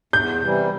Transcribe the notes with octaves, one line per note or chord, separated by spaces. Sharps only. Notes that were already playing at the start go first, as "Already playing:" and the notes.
E2 G6
C3 E3 G3